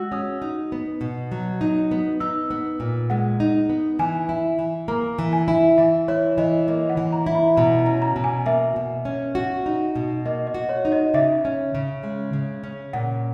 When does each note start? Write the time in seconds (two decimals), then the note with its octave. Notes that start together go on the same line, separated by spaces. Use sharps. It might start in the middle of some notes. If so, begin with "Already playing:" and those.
Already playing: G#3 F#4 E6
0.12 C#4 D#6
0.42 D#4
0.72 B3
1.01 B2
1.32 F#3
1.61 D#4
1.91 B3
2.20 D#4 E6
2.51 B3
2.80 A#2
3.10 G#3 F#5
3.40 D#4
3.69 B3
3.99 E3 G#5
4.29 E4
4.59 E3
4.88 A#3 A#5
5.19 E3
5.33 G#5
5.48 E4
5.78 E3 E5
6.08 E4 C#5
6.38 E3 D#5
6.68 A#3 D#5
6.89 F#5
6.97 E3
7.12 A#5
7.26 E4
7.35 B5
7.57 B2 A#5
7.79 A#5
7.86 C#4
8.02 A#5
8.16 B2
8.24 G#5
8.46 A#3 E5
8.76 B2
9.05 C#4
9.35 F#4
9.66 D#4
9.96 B2
10.26 A#3 D#5
10.47 D#5
10.54 F#4
10.69 C#5
10.85 D#4
10.92 D#5
11.14 C#3 E5
11.45 C#4
11.75 C#3
12.03 G#3
12.33 C#3
12.63 C#4
12.93 A#2 F#5